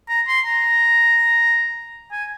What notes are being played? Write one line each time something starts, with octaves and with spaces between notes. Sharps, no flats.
A#5
C6
A#5
G#5